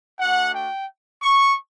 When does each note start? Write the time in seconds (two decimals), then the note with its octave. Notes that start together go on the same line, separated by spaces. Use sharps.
0.19 A3 D4 F#4 F#5
0.54 G5
1.22 C#6